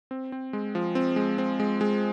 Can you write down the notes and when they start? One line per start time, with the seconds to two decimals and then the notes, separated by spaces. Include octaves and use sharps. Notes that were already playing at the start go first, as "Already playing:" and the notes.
0.11 C4
0.32 C4
0.53 G#3
0.75 F3
0.95 C4
1.16 G#3
1.38 C4
1.60 G#3
1.81 G#3